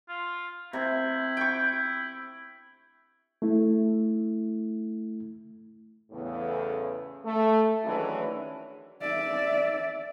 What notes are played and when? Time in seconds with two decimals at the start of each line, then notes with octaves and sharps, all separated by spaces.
0.09 F4
0.73 C3 E4
1.37 G5 C#6
3.42 A3 E4
6.11 E2 A2 C#3
7.24 A3
7.84 D#3 E3 F#3 G#3 C#4 D4
9.02 D5 E5